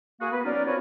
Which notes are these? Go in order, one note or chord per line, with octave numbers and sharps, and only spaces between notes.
A#3 F#4 G#4
B3 B4
F#3 C#4 D#4 F4 A#4 D5
F3 C4 F#4 A#4 B4 C#5